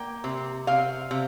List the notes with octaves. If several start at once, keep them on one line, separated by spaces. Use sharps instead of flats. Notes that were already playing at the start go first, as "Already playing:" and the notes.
Already playing: A#3 G5
C3
C3 F5
C3